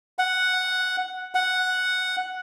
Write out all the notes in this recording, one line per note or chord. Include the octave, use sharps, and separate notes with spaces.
F#5
F#5